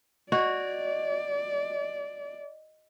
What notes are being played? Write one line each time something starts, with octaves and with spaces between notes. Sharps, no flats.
F#4 D5 D#5